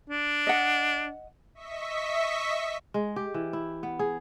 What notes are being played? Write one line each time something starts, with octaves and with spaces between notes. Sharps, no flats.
D4
D#5 F#5
D#5 E5 C#6 B6
G#3
G4
E3
E4
B3
G#4